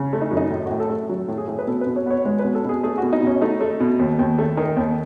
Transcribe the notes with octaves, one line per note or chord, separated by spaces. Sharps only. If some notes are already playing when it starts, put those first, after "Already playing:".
Already playing: C#3
A3
D#4
F#2
D#4
A2
A2 F#4
A4
A3
F#3
A2
G#4
A2
B4
B2 A4
B4
B2
C#5
B3 C#5
G#3 C#5
B2 B4
A4
B2 G#4
A3 G#4
B2 F#4
D#4
B2 C#4
A3 D#4
A3
B2
D#2
D#2
A3
D#3
D#2